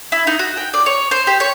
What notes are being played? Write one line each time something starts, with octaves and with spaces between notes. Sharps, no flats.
E4
D#4
F#4
G5
D5
C#5
C5
G4
C#5